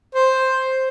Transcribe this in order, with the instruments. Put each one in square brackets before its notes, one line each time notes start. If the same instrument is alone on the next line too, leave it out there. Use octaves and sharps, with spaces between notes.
[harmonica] C5